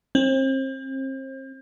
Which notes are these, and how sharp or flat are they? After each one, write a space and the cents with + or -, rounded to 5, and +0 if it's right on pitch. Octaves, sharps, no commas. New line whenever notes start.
C4 +35